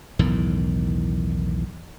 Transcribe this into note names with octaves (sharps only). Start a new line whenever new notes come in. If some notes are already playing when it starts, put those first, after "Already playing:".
B1 E2 A2 D#3